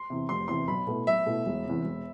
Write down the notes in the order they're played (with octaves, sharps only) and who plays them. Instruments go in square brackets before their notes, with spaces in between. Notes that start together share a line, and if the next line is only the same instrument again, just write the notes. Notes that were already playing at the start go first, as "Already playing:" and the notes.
Already playing: [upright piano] C6
[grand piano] E2 C3
[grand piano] F1 [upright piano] C6
[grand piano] E2 C3 [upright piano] C6
[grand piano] B1 [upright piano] B5
[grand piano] B2 A3 E4
[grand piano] B1 [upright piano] E5
[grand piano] B2 A3 E4
E1
E2 C3
E1